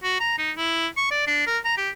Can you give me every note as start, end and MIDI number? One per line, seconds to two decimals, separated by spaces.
0.04 0.17 66
0.20 0.36 82
0.39 0.52 63
0.58 0.87 64
0.97 1.08 85
1.11 1.26 74
1.27 1.46 62
1.47 1.58 70
1.65 1.76 82
1.77 1.90 67